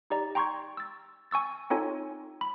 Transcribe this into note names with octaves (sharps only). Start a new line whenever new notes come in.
D#4 G4 D5 A#5
G5 A#5 C6 C#6 G6 G#6
E6 A6
G#5 C#6 E6 A6
C4 D#4 F4 A4 C#5 G#5
B5